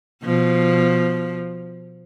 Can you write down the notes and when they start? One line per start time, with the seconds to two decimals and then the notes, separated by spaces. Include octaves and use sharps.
0.24 B2 F3